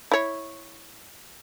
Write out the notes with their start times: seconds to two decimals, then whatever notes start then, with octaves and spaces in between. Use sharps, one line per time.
0.12 E4 C#5